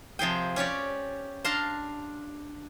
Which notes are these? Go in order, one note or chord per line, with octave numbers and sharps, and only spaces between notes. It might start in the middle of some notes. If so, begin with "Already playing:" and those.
C3 F3 G#4 G5
C#4 G4 C#5 D5
D4 F5 A5 A#5 C6